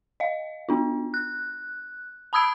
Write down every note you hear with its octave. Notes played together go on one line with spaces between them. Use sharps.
D#5 F5
B3 D4 F4
F#6
A5 B5 D#6 E6 G#6 D7